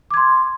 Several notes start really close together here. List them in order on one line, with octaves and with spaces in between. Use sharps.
D6 G#6 C6